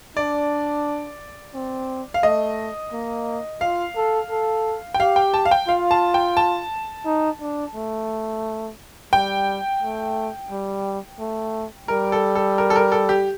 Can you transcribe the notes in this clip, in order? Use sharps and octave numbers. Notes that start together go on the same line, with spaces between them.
D4 D5
C4
F5
A3 D#5
A#3
F4 F5
A4
A4
G5
G4 F5
G5
A5
F5
G5
F4 F5
A5
G5
A5
D#4
D4
A3
G3 G5
A3
G3
A3
G3 A#4
A4
A4
A#4
A4
A#4
A4
G4